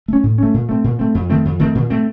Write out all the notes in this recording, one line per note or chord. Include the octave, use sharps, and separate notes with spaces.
A3 C#4
A2
A3 C#4
A#2
A3 C4
A#2
A3 C4
F2
D#3 A3 C4
F2
D#3 A3 C4
A#2
A3 C4